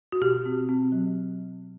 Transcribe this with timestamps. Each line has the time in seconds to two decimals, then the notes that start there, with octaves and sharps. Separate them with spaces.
0.12 F#4
0.21 B2 G4
0.45 C4
0.69 C4
0.92 F#3